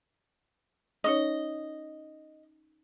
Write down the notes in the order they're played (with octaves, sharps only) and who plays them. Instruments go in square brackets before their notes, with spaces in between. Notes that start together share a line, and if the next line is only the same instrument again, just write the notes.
[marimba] C#4 D#4 C#5 [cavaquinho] D#5